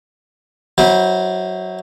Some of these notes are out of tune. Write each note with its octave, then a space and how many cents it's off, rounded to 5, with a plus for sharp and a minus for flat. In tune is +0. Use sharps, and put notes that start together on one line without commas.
F#3 +0 E4 -30 C5 +0